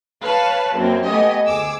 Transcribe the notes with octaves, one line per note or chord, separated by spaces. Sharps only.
B4 C#5 F5 A5
F#2 A#3 C4
A3 B3 G4 D#5 G#5
D2 G#4 D6 E6